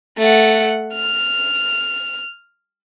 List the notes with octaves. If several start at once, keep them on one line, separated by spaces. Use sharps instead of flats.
A3 F#5
F6